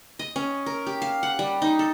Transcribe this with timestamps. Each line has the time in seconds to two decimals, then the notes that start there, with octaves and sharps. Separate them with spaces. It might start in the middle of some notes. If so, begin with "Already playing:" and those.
0.19 D#5
0.36 C#4
0.66 A#4
0.87 G4
1.02 F5
1.23 F#5
1.39 G3
1.62 D#4
1.79 A4